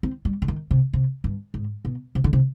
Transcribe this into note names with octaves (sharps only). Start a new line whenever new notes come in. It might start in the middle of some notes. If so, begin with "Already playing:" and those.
C4
G3
D3
D#3
C3
C3
G2
G#2
B2
C3
D3
C3